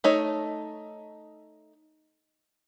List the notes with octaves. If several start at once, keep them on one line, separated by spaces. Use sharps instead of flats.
A3 D#4 C#5